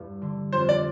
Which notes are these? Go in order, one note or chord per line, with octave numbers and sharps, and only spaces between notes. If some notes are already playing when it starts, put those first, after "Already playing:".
Already playing: E2 G2
D3
F2 C5
D5